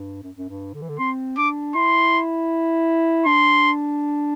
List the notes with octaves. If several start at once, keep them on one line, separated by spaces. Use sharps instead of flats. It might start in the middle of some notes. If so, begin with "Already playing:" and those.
Already playing: G2
F#2
F#2
G2
D3
E3
D3
C4 C6
D4 D6
E4 C6
D4 C6